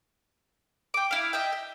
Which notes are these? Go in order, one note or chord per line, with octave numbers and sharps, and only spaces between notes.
G5 D6
E4 F5
D#5 E5 G5
G5